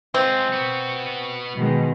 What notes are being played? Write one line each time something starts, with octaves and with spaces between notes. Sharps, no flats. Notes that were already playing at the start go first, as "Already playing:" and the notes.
G#3 C4 F4
B3 F#4
B2 D#3 G#3